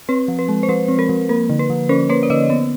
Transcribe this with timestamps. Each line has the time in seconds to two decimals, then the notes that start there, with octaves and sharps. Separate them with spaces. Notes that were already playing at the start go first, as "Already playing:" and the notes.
0.09 C4 B4
0.28 F3
0.39 B4
0.49 G#3
0.63 C5
0.69 F3 B4
0.88 C4
0.99 A#4
1.09 F3
1.29 A#3 A#4
1.50 D3
1.59 B4
1.70 F3
1.89 C#4 A#4 C5
2.10 A#3 B4 C#5
2.23 D5
2.30 D3 C#5 D#5
2.50 B3